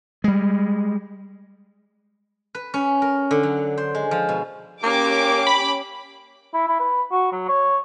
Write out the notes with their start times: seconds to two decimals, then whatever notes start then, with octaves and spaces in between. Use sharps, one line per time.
0.24 G3 G#3
2.55 B4
2.74 C#4
3.02 A#4
3.31 D3
3.43 F#3
3.77 C5
3.95 G#3
4.11 F3
4.29 B2
4.83 A#3 C#4 G4 D6
5.47 B5
6.54 E4
6.68 E4
6.80 B4
7.11 F#4
7.32 F#3
7.49 C#5